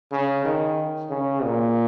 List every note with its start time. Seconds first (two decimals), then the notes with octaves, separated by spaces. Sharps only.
0.12 C#3
0.45 D#3
1.10 C#3
1.43 A#2